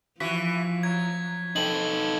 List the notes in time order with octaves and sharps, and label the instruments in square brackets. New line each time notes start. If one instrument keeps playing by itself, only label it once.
[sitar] E3 F#4 [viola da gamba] F3 [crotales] B6
[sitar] F#3 [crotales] G#6
[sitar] C4 [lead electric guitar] D#4 A4 [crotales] F#7